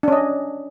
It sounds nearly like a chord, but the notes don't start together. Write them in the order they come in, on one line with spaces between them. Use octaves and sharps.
D4 C#4 D#5